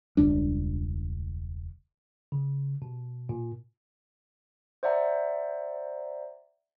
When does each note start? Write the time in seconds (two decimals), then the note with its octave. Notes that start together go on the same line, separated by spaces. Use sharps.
0.17 E1 C#2 G3 D4
2.32 C#3
2.82 B2
3.29 A#2
4.83 C5 D5 E5 F#5 A#5